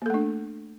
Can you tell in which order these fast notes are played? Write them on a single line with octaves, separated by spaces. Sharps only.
A#3 A4 A3 D4